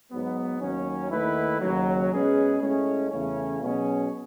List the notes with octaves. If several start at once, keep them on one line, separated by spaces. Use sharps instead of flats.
G#2 F#3 B3
D#2 D#3 F#3 C#4
D#2 D#3 A3 E4 B4
D#2 C#3 F#3
B2 G#3 C#4 G#4 B4
A2 G#3 C#4
E2 C#3 E3 A3 C#4
B2 F#3 C#4 G#4